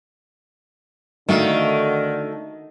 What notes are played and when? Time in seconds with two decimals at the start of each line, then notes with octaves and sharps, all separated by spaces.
1.29 D3 D#3 A3 F#4 F5